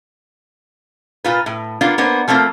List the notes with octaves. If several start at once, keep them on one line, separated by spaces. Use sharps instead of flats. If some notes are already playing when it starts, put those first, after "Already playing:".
A#2 F4 B4
A2
A#3 B3 D4 F4
A#3 B3 D4 C5
F3 A3 A#3 C4 F4